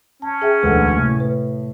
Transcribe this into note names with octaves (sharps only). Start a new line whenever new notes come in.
C#4 A5
G#4 E5 G5
E1 D2 D3 A4 B4
A2 C3
B4